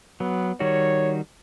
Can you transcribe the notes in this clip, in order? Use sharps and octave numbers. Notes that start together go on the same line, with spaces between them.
F#3 B3
D#3 G3 F#4 C#5